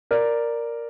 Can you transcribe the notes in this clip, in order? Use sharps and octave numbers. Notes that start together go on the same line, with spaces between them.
A#4 D5